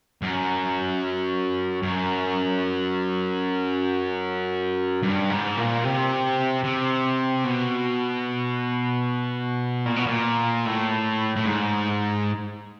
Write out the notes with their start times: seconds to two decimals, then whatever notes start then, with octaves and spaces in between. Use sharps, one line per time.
0.22 F#2
1.83 F#2
5.03 G2
5.30 G#2
5.57 A#2
5.84 C3
6.64 C3
7.44 B2
9.86 A#2
9.96 B2
10.06 A#2
10.66 A2
11.36 A2
11.46 G#2